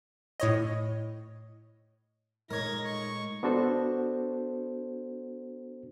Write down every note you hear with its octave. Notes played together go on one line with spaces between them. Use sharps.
A2 C#5 D#5
A#2 G#3 A3 D#4 A#4 C#5 G#6 A#6
C#6
B3 D4 F#4 A4 C5